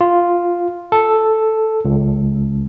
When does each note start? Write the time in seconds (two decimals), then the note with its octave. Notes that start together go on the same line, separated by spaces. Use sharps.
0.01 F4
0.92 A4
1.85 C#2